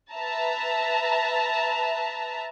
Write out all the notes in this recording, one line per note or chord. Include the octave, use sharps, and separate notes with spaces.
B4 E5 A5 A#5